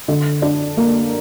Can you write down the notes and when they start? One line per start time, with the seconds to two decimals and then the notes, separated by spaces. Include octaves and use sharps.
0.08 D3
0.42 D4
0.77 A#3